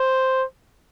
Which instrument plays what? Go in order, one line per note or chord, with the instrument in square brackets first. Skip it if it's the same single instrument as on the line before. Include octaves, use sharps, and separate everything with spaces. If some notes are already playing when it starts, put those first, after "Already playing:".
Already playing: [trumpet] C5